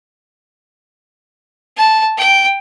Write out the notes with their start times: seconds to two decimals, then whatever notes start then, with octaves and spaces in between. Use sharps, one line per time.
1.77 A5
2.18 G5